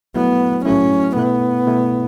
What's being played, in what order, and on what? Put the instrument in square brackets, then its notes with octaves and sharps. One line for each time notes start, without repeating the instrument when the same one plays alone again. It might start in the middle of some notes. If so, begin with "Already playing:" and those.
[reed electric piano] F#3 A3 E4 [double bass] B3
[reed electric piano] F#3 A3 E4 [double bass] C#4
[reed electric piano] B2 A3 E4 [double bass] B3
[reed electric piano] B2 A3 E4